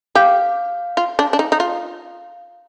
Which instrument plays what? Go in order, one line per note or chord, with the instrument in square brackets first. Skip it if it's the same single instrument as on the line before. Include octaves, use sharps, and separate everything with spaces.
[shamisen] G4 [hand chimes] F5
[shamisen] F4
D4
D4
D#4
D#4
F4